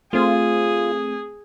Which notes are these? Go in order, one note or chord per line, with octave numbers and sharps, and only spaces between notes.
A3 C4 F4 G#4